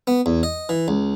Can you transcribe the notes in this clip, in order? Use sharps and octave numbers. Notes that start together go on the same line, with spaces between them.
B3
E2
D#5
E3
C#2